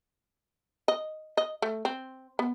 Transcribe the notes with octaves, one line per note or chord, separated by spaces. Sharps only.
D#5
D#5
A3
C4
B3